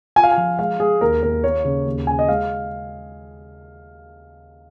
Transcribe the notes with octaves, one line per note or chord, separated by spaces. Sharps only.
F4 G#5
F5
G#5
F3
G#3 F5
G#3 G#4
D#2 A#4
D#2 A#4
A#3 C#5
C#3
D#2
C#3 G#5
D#5
G#3 F5